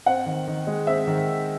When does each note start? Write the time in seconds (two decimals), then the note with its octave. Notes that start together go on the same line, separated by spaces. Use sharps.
0.06 C4 F#5
0.26 D#3
0.47 D#3
0.67 G#3
0.87 C4 E5
1.07 D#3